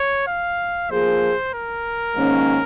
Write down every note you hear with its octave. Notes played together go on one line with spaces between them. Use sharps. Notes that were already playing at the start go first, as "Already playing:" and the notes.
Already playing: C#5
F5
F3 A#3 F4 G#4 C5
A#4
G#2 D#3 A#3 C#4